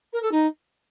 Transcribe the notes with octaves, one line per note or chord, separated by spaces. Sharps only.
A#4
A4
D#4